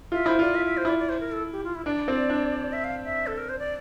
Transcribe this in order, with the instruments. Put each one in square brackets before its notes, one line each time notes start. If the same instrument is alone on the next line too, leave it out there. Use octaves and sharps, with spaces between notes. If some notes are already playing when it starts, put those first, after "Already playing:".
[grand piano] F4 [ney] E5
[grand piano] E4 [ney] C5
[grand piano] F4 [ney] D5
[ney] E5
E5
C5
[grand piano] E4 [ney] D5
[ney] D5
C5
A#4
A4
G4
F4
E4
[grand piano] D4 [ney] D5
[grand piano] C4
D4
[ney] E5
F5
E5
A4
A#4
C5
D5